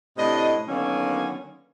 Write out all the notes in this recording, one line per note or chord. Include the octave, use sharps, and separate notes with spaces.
A2 C3 D4 D#5
D3 D#3 F#3 A#3 B3 C#4